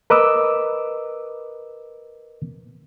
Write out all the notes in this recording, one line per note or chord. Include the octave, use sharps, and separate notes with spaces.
A#4 B4 D#5 D6 E6